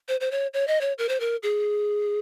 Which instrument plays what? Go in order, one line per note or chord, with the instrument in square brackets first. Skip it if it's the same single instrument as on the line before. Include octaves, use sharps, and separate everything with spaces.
[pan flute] C5
C5
C#5
C#5
D#5
C#5
A#4
C5
A#4
G#4